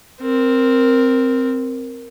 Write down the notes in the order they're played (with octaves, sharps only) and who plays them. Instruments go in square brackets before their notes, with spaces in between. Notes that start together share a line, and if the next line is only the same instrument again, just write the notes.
[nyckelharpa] C4 A#4